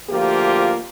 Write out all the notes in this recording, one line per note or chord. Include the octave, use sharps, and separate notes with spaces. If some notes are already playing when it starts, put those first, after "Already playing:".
D2 F3 A#3 F4 G4